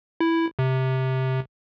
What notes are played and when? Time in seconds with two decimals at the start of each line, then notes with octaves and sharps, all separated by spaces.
0.20 E4
0.59 C3